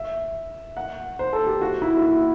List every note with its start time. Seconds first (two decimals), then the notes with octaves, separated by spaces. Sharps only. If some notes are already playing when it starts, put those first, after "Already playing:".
Already playing: E5
0.77 F#5
1.19 C5
1.33 A4
1.47 G4
1.61 F#4
1.82 E4
1.97 F#4
2.02 E4